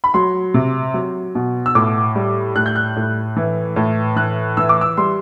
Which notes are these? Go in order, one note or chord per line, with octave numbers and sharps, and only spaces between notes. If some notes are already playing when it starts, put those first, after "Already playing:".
B5
F#3 C6
C3
F#3
B2
E6
A2 D6
G3
A2 F#6
G6
F#6
A2
E3
A2
E3 F#6
E3 E6
D6
E6
G3 C6